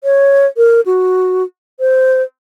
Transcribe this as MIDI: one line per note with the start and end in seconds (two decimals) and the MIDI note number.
0.04 0.46 73
0.57 0.81 70
0.86 1.43 66
1.80 2.22 72